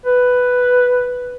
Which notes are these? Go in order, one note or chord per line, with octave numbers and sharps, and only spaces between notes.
B4